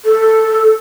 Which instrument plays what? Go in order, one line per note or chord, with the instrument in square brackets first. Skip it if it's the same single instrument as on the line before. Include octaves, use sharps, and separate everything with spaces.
[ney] A4